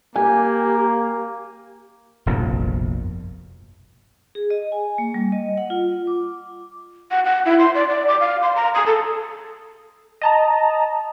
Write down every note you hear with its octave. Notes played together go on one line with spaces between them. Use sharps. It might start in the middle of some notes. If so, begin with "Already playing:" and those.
A#3 G4 G#5
F1 A#1 G2 B2
G#4
D#5
G#5
A#3
G3
D#5
F#5
F4
D6
F#5
F#5
E4
C6
D5
D5
D6
F5
C6
A#5
D#6
A4
D#5 A5 A#5